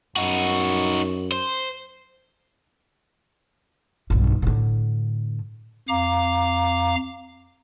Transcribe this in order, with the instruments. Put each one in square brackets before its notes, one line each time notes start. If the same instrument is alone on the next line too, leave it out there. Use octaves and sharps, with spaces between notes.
[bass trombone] F#2 [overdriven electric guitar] D#4 F#4
[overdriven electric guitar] C5
[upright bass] B1 G2
A2 D3
[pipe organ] F2 F5 A#5 D6